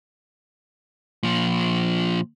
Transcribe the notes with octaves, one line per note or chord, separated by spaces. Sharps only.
A#2 F3